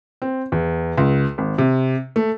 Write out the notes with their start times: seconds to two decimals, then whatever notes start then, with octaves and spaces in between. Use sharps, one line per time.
0.22 C4
0.52 E2
0.97 C#2
1.38 G#1
1.58 C3
2.16 A3